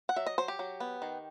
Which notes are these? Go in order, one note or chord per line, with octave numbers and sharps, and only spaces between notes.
F#5
F#3 E5
D#5
F#3 C5
G4
F#3
B3
D#3